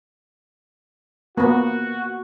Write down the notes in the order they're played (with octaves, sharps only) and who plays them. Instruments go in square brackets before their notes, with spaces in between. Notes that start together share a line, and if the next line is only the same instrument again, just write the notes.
[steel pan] A#3 B3 [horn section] F#4